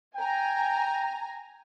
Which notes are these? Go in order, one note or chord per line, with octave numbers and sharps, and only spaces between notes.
G5 G#5 A#5